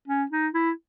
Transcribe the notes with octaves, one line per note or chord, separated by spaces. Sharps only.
C#4
D#4
E4